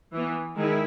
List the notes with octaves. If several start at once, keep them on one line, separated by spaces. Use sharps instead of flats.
E3 B3
D#3 G#3 E4